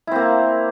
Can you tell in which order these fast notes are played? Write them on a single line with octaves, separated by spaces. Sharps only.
E4 C4 A#3